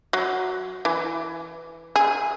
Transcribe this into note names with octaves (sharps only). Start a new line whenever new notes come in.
F#3
E3
G#4